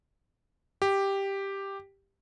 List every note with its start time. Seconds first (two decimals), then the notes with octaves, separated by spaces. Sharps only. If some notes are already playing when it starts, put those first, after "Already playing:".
0.82 G4